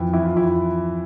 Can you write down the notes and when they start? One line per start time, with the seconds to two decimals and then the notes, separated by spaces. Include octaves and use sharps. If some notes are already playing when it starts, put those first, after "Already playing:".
Already playing: F2 E3 E4
0.13 E3 E4
0.26 F4
0.35 F2 E4